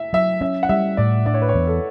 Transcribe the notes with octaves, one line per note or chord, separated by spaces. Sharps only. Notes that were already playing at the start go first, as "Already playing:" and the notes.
Already playing: E5
F#3 E5
C#4 E5
F#5
G3 E5
A2 D5
D4 D5
C#5
B4
C#5
E2
A4